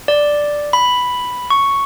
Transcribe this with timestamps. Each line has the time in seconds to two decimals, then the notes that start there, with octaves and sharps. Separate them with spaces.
0.08 D5
0.73 B5
1.50 C#6